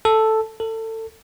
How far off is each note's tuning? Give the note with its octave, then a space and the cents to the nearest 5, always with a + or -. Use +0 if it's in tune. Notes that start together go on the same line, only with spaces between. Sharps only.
A4 +0
A4 +25